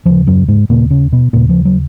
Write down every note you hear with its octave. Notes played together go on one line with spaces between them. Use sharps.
D#2 C#3 F3
F#2 F#3
G#2 G#3
D#2 A#2 C#3 A#3
C#3 C#4
B2 B3
D#2 A#2 C#3 A#3
F3
F#3